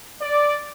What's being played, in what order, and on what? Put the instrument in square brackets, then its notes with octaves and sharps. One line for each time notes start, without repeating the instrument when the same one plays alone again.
[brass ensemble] D5